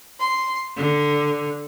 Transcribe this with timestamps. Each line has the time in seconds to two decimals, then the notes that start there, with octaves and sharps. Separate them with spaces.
0.21 C6
0.77 D3